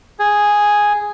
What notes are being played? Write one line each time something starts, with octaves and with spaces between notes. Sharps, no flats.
G#4